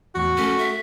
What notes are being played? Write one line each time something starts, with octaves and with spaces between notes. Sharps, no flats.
E2 A2 F#4
A3 C#4 A4
E5